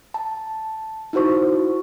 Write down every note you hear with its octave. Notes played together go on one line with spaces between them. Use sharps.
A5
D#4 E4 F#4 C5 C#6